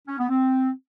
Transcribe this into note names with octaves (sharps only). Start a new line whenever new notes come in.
C#4
B3
C4